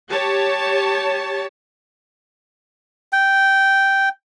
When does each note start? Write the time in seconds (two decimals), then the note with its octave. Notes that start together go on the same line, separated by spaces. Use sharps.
0.11 G4 C#5 A5
3.13 G5